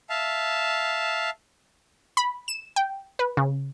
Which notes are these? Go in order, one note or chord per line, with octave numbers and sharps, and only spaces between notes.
E5 F5 A5
B5
E7
G5
B4
C#3